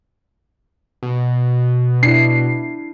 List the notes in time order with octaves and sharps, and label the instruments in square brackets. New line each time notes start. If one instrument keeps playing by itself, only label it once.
[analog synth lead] B2
[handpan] D4 E4 [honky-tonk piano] C7